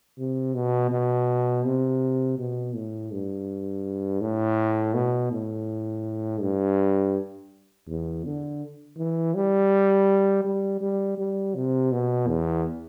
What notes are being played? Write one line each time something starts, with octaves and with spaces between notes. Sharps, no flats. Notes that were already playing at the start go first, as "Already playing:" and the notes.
C3
B2
B2
C3
B2
A2
G2
A2
B2
A2
G2
E2
D3
E3
G3
G3
G3
G3
C3
B2
E2